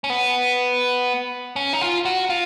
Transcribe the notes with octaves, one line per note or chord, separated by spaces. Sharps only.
C#4
B3
C#4
D#4
F4
F#4
F4